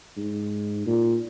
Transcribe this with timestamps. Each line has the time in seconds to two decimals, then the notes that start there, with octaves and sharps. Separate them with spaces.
0.17 G#2
0.86 A#2